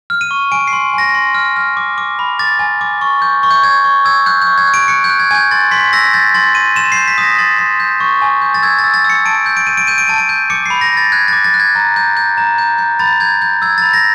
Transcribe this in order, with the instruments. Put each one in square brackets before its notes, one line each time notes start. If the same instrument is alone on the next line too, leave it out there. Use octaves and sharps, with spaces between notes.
[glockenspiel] F6
D#7
C#6
G#5 D7
C7
C6
G#5 A#6
C6
F6
F6
D6
D6
B5
D6 A6
G#5
D6
C#6
G6
C#6
G6
C#6 G#6
C#6
E6 G#6
F#6 G6
G6
C#6
G#6
F#6
D7
F#6 C#7
G6
F#6
G#6
G#5 G6 G#6
C6 A6
C6 B6
E6 A#6
G6 A6
C6 A6
C6 D#7
C6 E7
G6 C7
B6
D#6 A#6
C6 A6
C6
G6
C#6
G#5
G6
A6
E6 G#6
A6
E6
A6
E6
C#7
A5 D7
G6
D7
G6 D#7
D7
G6 D#7
D7
A5 D#7
D7
G6
D6 C#7
B5 C7
A#6
B5 A6
F#6 G#6
D6 A6
A6
F#6
G#6
A#5
G6
G6
A#5
G6
G6
B5 A6
G6 G#6
G6
E6 G#6
B5 A6
A#6